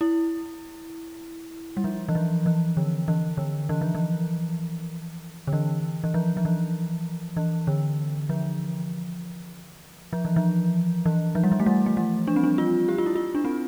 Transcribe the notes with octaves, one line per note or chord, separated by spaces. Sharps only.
E4
G3
F3
E3
F3
E3
D3
E3
D3
E3
F3
E3
D3
E3
E3
F3
F3
E3
E3
D3
F3
F3
E3
F3
E3
F3
G3
F3
A3
G3
A3
G3
D4
C4
D4
F4
G4
F4
E4
F4
D4
C4